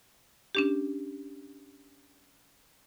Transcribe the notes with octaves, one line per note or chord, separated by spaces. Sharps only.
C#4 D4 G4